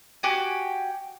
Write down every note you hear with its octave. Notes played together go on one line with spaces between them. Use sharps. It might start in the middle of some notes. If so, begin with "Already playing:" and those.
F#4 G4 G#5